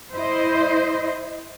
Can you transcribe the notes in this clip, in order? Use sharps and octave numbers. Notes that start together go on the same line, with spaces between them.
E4 C5 D#5